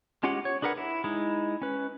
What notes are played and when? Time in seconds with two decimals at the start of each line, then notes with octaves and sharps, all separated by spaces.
0.23 G#3 C#4 F4 G4 F#5
0.45 C#5
0.62 D4 G#4 A#4 B4 F#5
0.77 E4
1.04 G#3 D#4 E4
1.62 C#4 B4